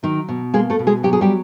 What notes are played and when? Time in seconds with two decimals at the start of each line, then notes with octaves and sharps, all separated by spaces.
0.03 D#3 F#3 D#4
0.29 B2
0.54 G#3 A#3 G#4
0.70 A3 A4
0.79 B2
0.87 G#3 G#4
1.03 F#3 G4
1.13 G#4
1.21 G3 G4